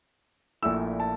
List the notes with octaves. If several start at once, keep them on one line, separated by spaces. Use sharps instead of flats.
A#1 A#2 A3 E4 E6
A5